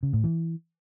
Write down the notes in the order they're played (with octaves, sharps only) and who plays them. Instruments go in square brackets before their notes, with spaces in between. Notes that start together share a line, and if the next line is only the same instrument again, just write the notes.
[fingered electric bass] C#3
A2
E3